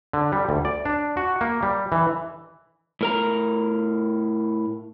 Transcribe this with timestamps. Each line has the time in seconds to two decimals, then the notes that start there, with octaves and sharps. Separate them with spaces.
0.13 D3
0.32 G3
0.49 D2
0.65 D5
0.85 D4
1.17 F#4
1.41 A#3
1.63 G3
1.92 E3
3.01 A2 A#4 A#5